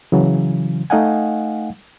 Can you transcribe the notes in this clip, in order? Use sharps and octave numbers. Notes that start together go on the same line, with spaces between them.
C#3 E3 F#3
A3 D#4 D#5 F5 F#5 G#5